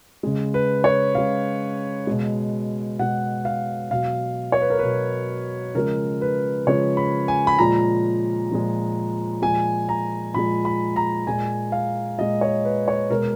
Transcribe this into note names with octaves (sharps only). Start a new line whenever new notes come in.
C#3 G#3
B4
C#5
C#3 G#3 F5
B2 G#3
B2 G#3 F#5
F5
B2 F#3 F5
C#5
B4
A#4
B2 F#3 B4
C#3 F3 G#3 A#4
B4
C#3 F3 G#3 C#5
B5
G#5
B5
A#2 F3 G#3 A#5
A#2 F3 G#3
A#2 F3 G#3 G#5
A#5
A#2 F3 G#3 B5
B5
A#5
A#2 G#3 G#5
F5
A#2 G#3 D#5
C#5
B4
C#5
B2 G#3 A#4